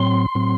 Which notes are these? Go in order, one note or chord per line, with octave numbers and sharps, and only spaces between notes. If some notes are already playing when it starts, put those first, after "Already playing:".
Already playing: A2 F#3 C4 C6
A2 F#3 C4